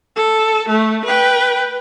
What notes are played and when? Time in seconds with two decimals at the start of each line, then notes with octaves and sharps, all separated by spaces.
0.16 A4
0.68 A3
1.05 B4 G5